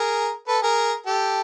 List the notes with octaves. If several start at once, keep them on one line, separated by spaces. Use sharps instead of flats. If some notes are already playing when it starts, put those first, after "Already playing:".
Already playing: G#4 A#4
A4 B4
G#4 A#4
G4 A4